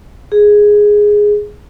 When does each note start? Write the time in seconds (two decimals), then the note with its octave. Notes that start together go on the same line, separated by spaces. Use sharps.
0.32 G#4